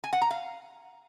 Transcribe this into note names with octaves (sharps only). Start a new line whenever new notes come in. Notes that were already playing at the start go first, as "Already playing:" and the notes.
G#5
F#5
A#5
F5